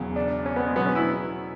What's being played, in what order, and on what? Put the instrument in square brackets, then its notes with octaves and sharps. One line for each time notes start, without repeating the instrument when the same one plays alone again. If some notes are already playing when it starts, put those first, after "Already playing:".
Already playing: [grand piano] E1 E2 C#3 F#3
[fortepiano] D4
C#4
B3
G#3
[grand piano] E2 B2 F#3 [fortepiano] B3
[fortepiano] C#4
E4